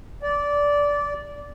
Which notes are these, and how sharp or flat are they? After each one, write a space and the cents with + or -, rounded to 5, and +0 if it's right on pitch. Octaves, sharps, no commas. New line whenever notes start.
D5 -15